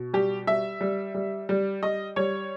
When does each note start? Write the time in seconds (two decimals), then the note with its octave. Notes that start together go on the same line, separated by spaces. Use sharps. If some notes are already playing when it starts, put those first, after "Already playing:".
Already playing: B2
0.13 G3 G4
0.47 G3 E5
0.81 G3
1.14 G3
1.49 G3
1.82 G3 D#5
2.16 G3 C#5